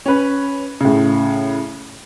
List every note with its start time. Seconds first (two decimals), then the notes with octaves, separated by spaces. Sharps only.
0.06 C#4 B4
0.81 A2 C#3